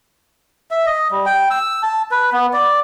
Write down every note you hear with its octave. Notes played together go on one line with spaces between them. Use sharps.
E5
D#5
G3
G5
E6
A5
B4
B3
D5